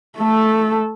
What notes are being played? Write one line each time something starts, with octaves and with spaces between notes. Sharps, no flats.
A3 A4